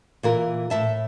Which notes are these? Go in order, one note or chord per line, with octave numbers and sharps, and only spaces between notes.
A#2 E3 A#4
A2 E5 A5